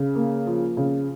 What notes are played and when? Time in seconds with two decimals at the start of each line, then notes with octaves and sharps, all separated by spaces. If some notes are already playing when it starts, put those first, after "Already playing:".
Already playing: C#3
0.15 A#3
0.47 F3
0.77 C#3